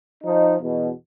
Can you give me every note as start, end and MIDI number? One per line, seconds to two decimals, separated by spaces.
0.24 0.56 53
0.24 0.56 63
0.61 0.90 40
0.61 0.90 47